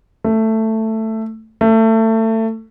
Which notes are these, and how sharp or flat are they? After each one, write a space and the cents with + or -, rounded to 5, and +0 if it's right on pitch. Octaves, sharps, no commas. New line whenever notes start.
A3 +10
A3 +25